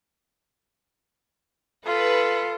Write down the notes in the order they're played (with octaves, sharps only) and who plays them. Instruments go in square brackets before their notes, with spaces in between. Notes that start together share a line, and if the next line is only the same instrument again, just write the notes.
[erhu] F4 [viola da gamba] A4 [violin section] B4